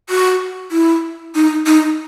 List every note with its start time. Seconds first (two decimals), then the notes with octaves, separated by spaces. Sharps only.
0.09 F#4
0.71 E4
1.35 D#4
1.66 D#4